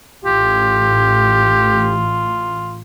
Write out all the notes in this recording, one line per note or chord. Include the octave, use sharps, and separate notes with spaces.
A1 F4 G4